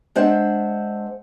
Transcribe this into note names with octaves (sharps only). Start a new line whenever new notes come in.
G#3 D4 C5 E5 F#5